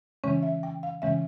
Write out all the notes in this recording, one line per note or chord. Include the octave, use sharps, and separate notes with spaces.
C#3 E3 G#3 C#4 C#5
E5
G5
F5
C#3 E3 G#3 C#4 E5